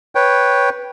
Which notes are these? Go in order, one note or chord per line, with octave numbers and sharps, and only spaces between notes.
B4 C#5 G5